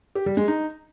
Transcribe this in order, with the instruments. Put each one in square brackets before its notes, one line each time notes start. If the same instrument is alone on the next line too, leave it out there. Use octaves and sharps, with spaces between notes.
[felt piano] G4
G3
G#3
D#4